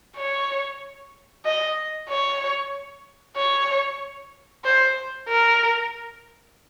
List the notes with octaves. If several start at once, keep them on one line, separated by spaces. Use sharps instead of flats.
C#5
D#5
C#5
C#5
C5
A#4